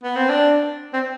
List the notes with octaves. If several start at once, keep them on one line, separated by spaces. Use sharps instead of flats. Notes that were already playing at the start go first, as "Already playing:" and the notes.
B3
C4
D4
C4